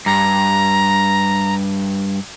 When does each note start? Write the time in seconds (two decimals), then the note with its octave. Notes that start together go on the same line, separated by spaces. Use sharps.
0.06 G2 A#5